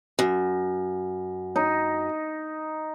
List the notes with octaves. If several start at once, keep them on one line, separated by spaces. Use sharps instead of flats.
F#2
D#4